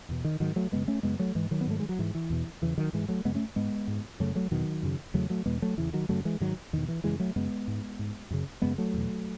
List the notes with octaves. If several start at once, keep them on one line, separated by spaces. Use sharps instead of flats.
E2 B2
D#3
G#2 D#3 F#3
F#3 A3
F#2 C#3 G#3 B3
A3 C#4
F#2 C#3 G#3 B3
F#3 A3
G#2 E3 G#3
D#3 F#3
B3
G#2 A3
G#3
F#3
G#2 E3
E3
E2 B2
E2 C#3 E3
D#3 F#3
G#2 E3 G#3
F#3 A3
F#2 C#3 G#3 B3
A3 C#4
G#2 G#3 B3
G#2
F#2 C#3 F#3 A3
F#3 A3
E2 B2 D#3 F#3
F#2 C#3
E2 C#3 F#3 A3
F#3 A3
E2 B2 G#3 B3
F#3 A3
E2 C#3 E3
D#3 F#3
F#2 C#3 F#3 A3
E3 G#3
G#2 D#3 F#3
E2 B2 D#3
E3
F#2 C#3 E3 G#3
F#3 A3
F#2 C#3 G#3 B3
G#2
G#2
F#2 C#3
F#2 C#3 G#3 B3
F#3 A3
E2 B2